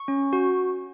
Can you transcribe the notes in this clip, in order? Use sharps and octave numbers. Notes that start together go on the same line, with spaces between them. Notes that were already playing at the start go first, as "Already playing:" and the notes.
Already playing: C#6
C#4
F#4